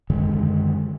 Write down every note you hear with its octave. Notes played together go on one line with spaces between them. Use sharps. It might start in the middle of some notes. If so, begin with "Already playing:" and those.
F#2 D3 D#3 G#3